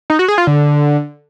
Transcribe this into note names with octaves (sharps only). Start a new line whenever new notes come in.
D#4
F#4
G#4
F4
D3